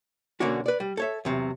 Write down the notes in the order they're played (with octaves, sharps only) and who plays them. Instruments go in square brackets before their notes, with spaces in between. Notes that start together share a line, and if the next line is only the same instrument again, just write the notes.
[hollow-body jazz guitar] B1 D3 A#3 C#4 D4 F#4
B4 D5
G3
A4 C#5 E5
E2 C3 F#3